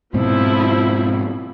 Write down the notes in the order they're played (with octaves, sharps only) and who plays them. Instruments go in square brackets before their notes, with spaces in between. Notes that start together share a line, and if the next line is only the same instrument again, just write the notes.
[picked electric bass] G#2 B2 C4 [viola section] F3 E4